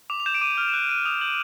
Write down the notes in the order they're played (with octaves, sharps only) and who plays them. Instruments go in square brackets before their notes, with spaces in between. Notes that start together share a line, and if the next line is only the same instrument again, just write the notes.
[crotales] D6 F7
F7
G6 E7
D7
D6 D#7
F6
E7
F#6 F7
F#6 D#7
D#6 F7
G6 F#7